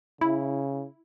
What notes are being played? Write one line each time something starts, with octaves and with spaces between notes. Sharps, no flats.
C#3 E4